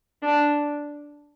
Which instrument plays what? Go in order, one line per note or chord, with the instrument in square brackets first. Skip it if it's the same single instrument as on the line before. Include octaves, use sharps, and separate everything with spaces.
[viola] D4